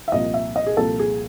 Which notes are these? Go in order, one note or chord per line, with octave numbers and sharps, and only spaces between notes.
E5
C2 A#2 F3 D#5
E5
D#5
G#4
C2 A#2 F3 A4
G#4